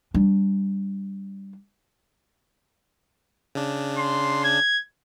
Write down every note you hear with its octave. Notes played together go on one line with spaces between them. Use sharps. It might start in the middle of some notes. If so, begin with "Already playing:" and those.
G3 D4
C#3 D4
C6
G#6